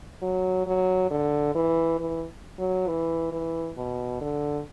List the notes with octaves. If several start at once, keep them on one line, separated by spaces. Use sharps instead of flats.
F#3
F#3
D3
E3
E3
F#3
E3
E3
B2
D3